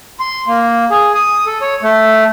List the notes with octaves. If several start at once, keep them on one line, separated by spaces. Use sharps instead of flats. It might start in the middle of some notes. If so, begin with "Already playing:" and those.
C6
A#3
G#4
D#6
A4
C#5
A3